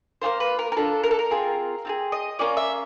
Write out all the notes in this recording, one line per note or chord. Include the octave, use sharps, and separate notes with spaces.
A#3 D4 F4 C5
B4
A#4
A#4
A#3 D4 F4 A4
A#4
A4
A#4
C4 F4 G#4
C4 F4 G#4
D#5
A#3 C#4 F4 D5
E5